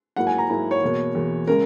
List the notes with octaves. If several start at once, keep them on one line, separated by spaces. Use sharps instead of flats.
G#2 F#3 A#3 E4 F#5
G#5
A#5
G#2 F#3 A#3 E4
C#5
E2 B2 A#3
E2 B2 A#3
C#3 G#3 A#4